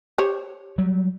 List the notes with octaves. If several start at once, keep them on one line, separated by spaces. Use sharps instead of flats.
G4 C5 C#5
F#3 G3